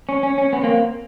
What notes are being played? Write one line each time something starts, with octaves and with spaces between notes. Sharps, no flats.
C#4
C#4
C#4
B3 C#4
A#3 C4